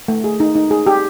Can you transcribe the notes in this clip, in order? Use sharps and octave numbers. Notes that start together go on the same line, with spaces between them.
A3
G#4
D#4
D#4
G#4
G4